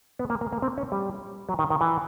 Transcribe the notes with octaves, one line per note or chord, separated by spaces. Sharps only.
B3
A#3
A#3
A#3
C4
C#4
G3
F#3
D#3
D#3
E3